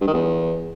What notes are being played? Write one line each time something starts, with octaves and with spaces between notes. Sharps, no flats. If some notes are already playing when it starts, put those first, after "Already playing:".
G2
D#3
E2